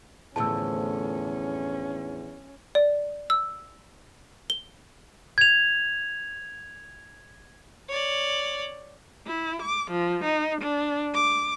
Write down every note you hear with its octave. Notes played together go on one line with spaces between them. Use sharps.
E2 A2 D3 F3 C#4 A5 E6
D5
E6
G7
G#6 F7
C#5 D5
E4
D6
F3
D#4
D4
D6